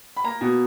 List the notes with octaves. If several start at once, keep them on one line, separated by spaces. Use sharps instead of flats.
B5
A#3 A#5
B2